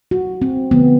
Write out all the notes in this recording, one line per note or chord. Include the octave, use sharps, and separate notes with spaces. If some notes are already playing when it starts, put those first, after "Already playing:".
F#4
C4
D3 F3 A3 B3